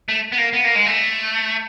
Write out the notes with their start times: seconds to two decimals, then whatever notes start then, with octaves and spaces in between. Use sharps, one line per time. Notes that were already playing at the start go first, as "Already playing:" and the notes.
0.09 A3
0.32 B3
0.38 A#3
0.53 B3
0.64 A#3
0.75 G#3
0.86 A3